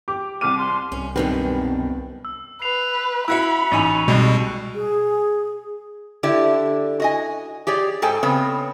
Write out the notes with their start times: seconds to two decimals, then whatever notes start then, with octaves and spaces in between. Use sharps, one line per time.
0.08 G4 D6
0.41 C2 D6 F6 D#7
0.58 C6
0.92 C2 C#4
1.16 F#2 B2 D#3 G3 C4 D4 B4
2.25 E6
2.62 B4 C7 F7
3.28 E4 F#4 E5 B5 E6 F#6 C#7
3.71 A1 D#4 G#5 C#6 D#7 F7
4.08 C2 B2 G3 G#3
4.75 G#4
6.23 D3 E4 G4 D5
7.00 F#4 D#5 G#5
7.67 G4 G#4 C#5 D5
8.02 G#2 A4 C5 G5 G#5
8.23 C#3 B3 C4 B4 C#5